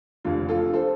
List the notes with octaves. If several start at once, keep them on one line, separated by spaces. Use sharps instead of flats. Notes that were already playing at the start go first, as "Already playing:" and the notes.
F1 F2 D3 F4
F4 A4
A4 C5